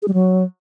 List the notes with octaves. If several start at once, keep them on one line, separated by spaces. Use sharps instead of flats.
G#4
G3
F#3